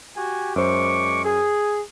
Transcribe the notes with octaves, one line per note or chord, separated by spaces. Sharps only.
F#4 G4 G#5
F#2 G#3 C5 C#6 D6
G#4